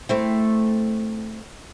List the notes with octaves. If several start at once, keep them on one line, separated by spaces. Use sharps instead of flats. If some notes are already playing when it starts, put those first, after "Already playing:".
A3 C4 E4